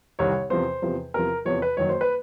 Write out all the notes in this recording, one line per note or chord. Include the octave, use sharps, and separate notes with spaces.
C2 C3 D#3 C#5
E2 C3 F3 C5
E2 C3 F3
E2 C3 F3 A#4
E2 C3 F3 C#5
B4
F#1 F#2 D#3 F#3 C#5
C5
B4